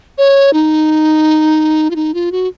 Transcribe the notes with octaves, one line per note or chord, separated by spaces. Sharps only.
C#5
D#4
F4
D#4
F4
F#4